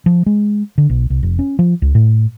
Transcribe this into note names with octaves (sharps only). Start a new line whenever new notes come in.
F3
G#3
D3
B1
C2
F1
C#4
F3
C#2
A2